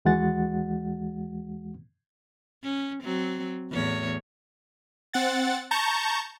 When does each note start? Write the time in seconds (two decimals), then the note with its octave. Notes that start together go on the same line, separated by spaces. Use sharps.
0.05 D#2 E3 G#3 F#4 F#5 A6
2.64 C#4
3.03 F#3 C4
3.71 E2 A2 C#5
5.13 C4 F#5 A6
5.71 A5 A#5 C#6 G6